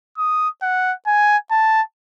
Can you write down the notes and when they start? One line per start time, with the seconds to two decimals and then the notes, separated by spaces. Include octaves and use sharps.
0.18 D#6
0.62 F#5
1.07 G#5
1.51 A5